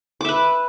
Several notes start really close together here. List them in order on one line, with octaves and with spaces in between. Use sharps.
D6 E5 B4